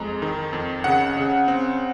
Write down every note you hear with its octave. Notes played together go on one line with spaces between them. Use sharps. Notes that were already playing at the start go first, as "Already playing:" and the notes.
Already playing: F2 G#3 A#5
D#3
F2
C#3 F#5
C#3
C4